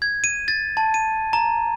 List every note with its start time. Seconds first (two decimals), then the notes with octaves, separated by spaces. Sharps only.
0.02 G#6
0.24 D#7
0.48 A6
0.77 A5
0.94 D#7
1.33 A#5